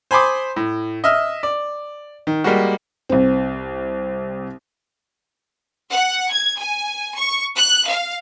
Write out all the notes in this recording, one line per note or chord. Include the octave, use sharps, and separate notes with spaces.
C5 G#5 B5 C6 D6 D#6
A2
D#5 E5 F6
D5
D#3
G3 G#3 A#3 F#4
C2 C4
F#5
G#6
G#5
C#6
F#6
F5